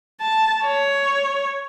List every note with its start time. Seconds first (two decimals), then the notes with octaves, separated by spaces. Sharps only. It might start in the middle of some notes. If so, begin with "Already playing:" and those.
0.21 A5
0.65 C#5